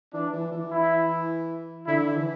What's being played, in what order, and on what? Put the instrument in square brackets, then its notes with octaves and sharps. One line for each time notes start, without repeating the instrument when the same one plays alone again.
[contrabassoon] E3 [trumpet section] D4
[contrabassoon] E3
E3
[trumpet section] E4
[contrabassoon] D3 [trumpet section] E4
[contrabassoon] E3